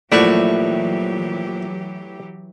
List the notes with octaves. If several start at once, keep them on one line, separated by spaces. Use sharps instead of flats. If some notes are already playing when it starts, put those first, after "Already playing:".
A#1 E3 F#3 A3 E4 F#4 G4 D5